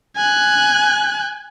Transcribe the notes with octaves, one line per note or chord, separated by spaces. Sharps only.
G#5 F#6